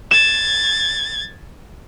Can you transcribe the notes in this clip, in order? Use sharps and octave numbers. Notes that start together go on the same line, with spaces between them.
G#6 A6 E7